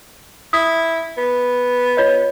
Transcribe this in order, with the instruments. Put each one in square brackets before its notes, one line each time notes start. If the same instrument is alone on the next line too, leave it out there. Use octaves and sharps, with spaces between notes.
[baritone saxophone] E4 [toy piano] D#6
[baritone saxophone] B3
[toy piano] F4 C#5 D#5